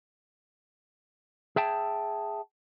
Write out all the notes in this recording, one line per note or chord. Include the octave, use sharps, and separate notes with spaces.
G#4 E5 G5 A5